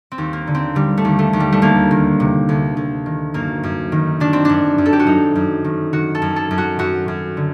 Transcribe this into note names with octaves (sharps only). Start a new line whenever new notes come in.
C4
D#2
A#3
D3
C4
D3 G3
A3
D#2
A3
D#2
G3
A3
D2 A#3
D#3
C3
D2
D2
D#3
F#2 A#3
F#2
D#3
D#3 D4
C4
F#2 D4
F#2
A4
G4
F#4
F#2 D#4
F#2
D#3
D#3 F#4
A4
F#2
A4
F#2
F#4
F#2 F#4
F#2
D3